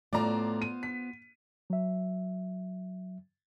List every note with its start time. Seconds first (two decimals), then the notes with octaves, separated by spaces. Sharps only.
0.13 A2 A3 B3 F4 C5 D5 A#5
0.62 D#7
0.83 B6
1.70 F#3 E5